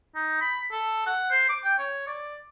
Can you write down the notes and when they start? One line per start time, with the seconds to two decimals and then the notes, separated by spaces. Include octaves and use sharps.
0.15 D#4
0.41 B5
0.71 A4
1.07 F#5
1.31 C5
1.49 D6
1.64 G5
1.79 C#5
2.07 D5